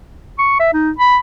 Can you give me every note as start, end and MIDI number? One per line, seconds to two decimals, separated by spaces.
0.39 0.57 85
0.60 0.71 76
0.74 0.91 63
0.98 1.18 83